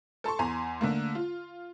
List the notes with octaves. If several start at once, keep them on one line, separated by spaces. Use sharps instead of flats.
A4 A5 C6 C#6
E2 G#5 A#5 C6
D3 A3 A#3
F4